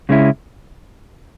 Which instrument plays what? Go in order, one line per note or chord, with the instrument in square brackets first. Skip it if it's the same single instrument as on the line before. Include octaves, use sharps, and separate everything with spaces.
[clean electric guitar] C#3 G#3 C#4 E4